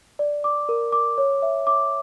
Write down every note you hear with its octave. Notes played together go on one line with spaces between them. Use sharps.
D5
D6
A#4
D6
C#5
E5
D6